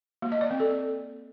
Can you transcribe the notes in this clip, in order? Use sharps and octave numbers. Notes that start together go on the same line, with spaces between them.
A#3
D#5
D5
C4
A4